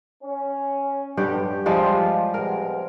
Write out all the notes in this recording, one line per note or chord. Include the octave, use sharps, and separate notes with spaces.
C#4
G2 B2 D3 G4 F#5
F3 G3 G#3 F4
C3 G#3 B3 A#4